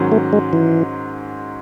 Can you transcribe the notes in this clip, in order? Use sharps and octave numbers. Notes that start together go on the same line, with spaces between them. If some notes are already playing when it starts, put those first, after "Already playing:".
Already playing: G#2 D#3 F#3 C#4
A3
G#3
E3